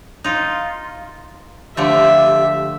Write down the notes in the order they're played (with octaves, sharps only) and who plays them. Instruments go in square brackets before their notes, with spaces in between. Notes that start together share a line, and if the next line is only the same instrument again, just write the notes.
[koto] D#4 F4
[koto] D3 F3 A3 [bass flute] G4 [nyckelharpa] E5